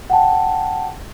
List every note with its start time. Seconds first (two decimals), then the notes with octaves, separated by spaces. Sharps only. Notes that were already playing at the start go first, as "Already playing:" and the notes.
0.10 F#5 G5 A5